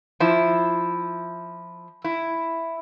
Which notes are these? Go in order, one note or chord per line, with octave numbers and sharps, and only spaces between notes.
F3 E4
E4